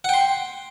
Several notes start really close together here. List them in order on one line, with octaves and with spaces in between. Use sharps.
F#5 G5 C6